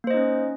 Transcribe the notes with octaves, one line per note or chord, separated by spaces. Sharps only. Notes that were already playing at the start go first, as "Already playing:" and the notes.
A#3 C#4 D#4 C5 D#5